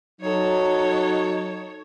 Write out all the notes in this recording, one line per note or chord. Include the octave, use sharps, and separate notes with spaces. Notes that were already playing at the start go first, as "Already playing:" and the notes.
F#3 D#4 A4 C#5